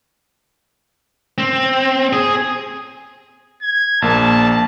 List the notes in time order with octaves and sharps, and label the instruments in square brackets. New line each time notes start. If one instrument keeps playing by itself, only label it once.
[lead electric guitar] C4
G#4
[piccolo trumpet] G#6
[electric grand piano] A#1 A#3 [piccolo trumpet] A5